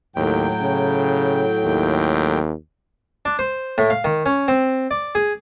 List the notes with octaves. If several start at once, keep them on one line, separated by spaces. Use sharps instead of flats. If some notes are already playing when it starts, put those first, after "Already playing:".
D#2 A2 F#3 G5
C#3
D#2
D4
C5
A2
F5
D#3
C#4
C4
D5
G#4